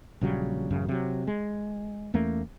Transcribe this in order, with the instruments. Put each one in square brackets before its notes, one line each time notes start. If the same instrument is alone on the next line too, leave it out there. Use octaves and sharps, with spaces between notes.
[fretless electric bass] A#1 C#3 F#3 G3
A1 F#2 C#3
C3 F#3
G#3
E2 A3 A#3 C#4